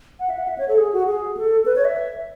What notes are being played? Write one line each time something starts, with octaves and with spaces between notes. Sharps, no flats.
F#5
E5
F#5
E5
C#5
A4
G#4
F#4
G#4
A4
B4
C#5
E5